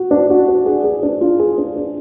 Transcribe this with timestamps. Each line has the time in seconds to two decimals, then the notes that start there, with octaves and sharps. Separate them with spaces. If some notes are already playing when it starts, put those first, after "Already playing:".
Already playing: F#4
0.11 D4
0.30 F#4
0.49 D4
0.66 G#4
0.84 G#4
1.03 D4
1.21 F4
1.40 G#4
1.58 D4
1.76 D4